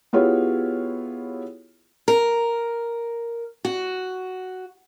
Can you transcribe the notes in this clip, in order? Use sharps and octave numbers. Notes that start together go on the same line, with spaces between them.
B3 E4 F4 G4 G#4 C#5
A#4
F#4